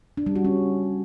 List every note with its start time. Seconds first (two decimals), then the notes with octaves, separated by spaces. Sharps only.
0.17 D4
0.27 G3
0.36 F#4
0.45 C#4